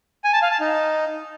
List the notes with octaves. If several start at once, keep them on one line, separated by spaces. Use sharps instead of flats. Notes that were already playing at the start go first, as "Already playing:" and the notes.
G#5
A5
F5
A5
D#4